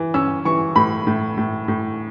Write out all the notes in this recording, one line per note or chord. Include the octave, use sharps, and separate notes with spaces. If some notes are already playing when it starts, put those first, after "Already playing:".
Already playing: E3
C#4 E6
E3 C#6
A2 B5
A2
A2
A2